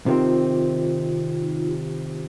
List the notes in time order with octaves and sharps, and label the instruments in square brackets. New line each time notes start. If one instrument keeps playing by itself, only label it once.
[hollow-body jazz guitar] C3 D#3 C4 [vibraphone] F4
[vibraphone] D#4
F4
G4